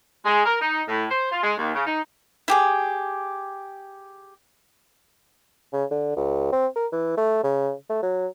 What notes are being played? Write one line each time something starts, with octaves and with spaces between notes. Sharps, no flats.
G#3
A#4
D#4
A2
C5
F4
G#3
D#2
C#3
D#4
E4 G4 G#4
C#3
D3
C#2
C4
A#4
E3
A3
C#3
A3
F#3